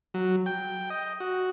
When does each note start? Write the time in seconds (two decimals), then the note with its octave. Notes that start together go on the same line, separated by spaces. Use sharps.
0.14 F#3
0.46 G5
0.90 D#5
1.20 F#4